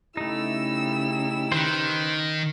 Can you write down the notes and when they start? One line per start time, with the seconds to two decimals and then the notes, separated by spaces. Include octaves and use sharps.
0.17 C#3 A3 D#4 E4 G4 E6
1.52 D#3 B4 C5